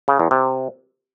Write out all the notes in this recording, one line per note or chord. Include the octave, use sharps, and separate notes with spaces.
C#3
E2
C3